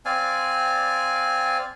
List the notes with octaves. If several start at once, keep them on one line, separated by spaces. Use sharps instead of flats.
C4 D5 F5 G#5